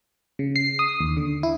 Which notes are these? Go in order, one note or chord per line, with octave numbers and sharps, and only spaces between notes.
C#3
C7
D#6
D#2
D3
E4